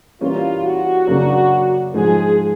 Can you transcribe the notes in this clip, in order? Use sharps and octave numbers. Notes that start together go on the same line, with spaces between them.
E3 G3 A#3 C#4 F4
F#4
F#2 C#3 F#3 A#3 D4
G#2 F3 G#3 G#4